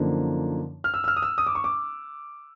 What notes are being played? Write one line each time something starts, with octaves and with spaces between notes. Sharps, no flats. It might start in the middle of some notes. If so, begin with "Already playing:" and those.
Already playing: F#2 D3 F3 A#3 D#4
F6
E6
E6
F6
D#6
E6
D#6
D6
C#6
D6